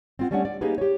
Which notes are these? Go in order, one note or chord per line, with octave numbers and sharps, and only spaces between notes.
C4 F4 F#5
G3 A3 C#4 D4 C#5 F#5
D5
A#3 D#4 G4 G#4 B4
G4 C#5